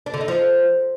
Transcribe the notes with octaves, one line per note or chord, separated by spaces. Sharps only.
D4
D3
D#4
F3